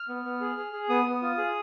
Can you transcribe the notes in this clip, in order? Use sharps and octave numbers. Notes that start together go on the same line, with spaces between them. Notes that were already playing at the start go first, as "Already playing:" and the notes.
Already playing: F6
B3
B3
G#4
G#4
G#4
B3 D#6
B3
F4
G#4